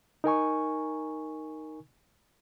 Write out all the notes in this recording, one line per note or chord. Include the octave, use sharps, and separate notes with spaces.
D#4 A#4 G#5 C#6